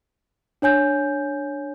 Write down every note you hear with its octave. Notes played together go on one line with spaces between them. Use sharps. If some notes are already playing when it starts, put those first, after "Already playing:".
D4 C#5 G#5 G6